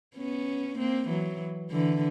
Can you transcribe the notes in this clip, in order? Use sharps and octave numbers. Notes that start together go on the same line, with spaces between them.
B3 C#4
A#3 C4
E3 F#3
D3 E3